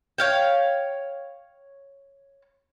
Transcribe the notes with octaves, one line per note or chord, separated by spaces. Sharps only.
C#5 F5 G5